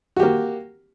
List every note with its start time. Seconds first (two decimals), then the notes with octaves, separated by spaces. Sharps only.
0.16 F#4
0.20 G4
0.23 A#3